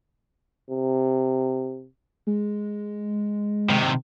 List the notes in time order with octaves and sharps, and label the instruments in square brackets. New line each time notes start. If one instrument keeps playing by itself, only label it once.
[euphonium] C3
[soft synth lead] G#3
[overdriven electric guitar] C3 D#3